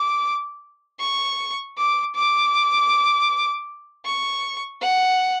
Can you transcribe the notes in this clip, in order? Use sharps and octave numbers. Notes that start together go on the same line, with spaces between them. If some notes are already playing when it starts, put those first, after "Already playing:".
Already playing: D6
C#6
D6
D6
C#6
F#5